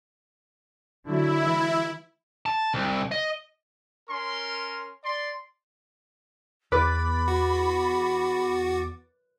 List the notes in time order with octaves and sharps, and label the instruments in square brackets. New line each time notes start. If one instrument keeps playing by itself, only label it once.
[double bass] D3 F#3 [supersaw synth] E4
[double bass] E3 G#3
[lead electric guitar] A5
C2
D#5
[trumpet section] C#4 A#4 C6
D5 C6
[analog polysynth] E2 D6 A6 [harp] B4 [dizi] B5
[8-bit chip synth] F#4